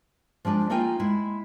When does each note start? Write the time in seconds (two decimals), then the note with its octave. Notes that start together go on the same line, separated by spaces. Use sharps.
0.45 F3 G#3 D4 G4
0.70 A3 A#3 D#4 F4 G5 G#5
1.00 G#3 E4